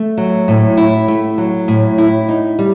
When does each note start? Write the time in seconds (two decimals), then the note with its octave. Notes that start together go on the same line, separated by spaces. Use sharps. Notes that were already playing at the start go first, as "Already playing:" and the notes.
Already playing: A3
0.17 F#3
0.48 A2
0.77 E4
1.08 A3
1.38 F#3
1.68 A2
1.98 E4
2.29 D#4
2.59 G3